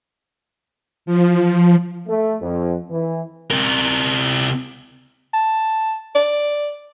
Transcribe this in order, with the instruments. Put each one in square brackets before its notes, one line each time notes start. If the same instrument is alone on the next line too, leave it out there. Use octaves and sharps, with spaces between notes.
[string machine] F3
[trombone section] A3
F2
E3
[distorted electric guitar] C3 A#4
[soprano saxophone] A5
D5